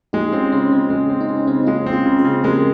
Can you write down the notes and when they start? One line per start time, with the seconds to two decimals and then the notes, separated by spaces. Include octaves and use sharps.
0.13 G#3 D#4 G4
0.32 C4 C#4 F4
0.52 C#3 C#4
0.71 C#3 C4
0.90 G#3 C#4
1.09 C4 C#4
1.21 D#4
1.29 C#3 C#4
1.47 C#3 C4 D#4
1.67 G#3 C#4 F4
1.86 C4
1.92 F4 G#4
2.06 C#3
2.18 G#4 C5
2.25 C#3
2.44 G#3 G4 A#4